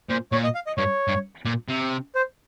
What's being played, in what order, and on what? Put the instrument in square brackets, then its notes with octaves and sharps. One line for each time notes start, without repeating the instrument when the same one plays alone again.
[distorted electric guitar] A#2 [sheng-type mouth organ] C5
[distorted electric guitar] A#2 [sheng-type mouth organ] C#5
[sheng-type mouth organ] D#5
F5
D#5
[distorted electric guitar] G2 [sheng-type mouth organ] C#5
[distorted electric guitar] G2
A#2
C3
[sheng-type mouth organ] C5